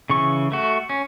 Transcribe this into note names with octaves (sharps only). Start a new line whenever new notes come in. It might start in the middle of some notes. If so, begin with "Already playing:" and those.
C#3 E3 C#6
A3 F#4
C#4